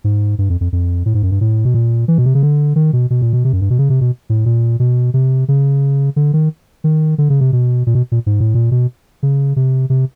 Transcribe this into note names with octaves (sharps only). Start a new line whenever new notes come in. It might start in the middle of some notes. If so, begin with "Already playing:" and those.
G#2
G2
F2
F2
F2
A2
G#2
F#2
G2
A2
B2
A#2
E3
B2
C3
C#3
D3
D#3
B2
B2
A#2
B2
C3
F#2
G2
B2
C#3
C3
B2
A2
A#2
B2
C3
C#3
D3
D#3
D#3
D3
C#3
C3
B2
A#2
B2
A#2
G#2
A2
A#2
B2
C#3
C3
C3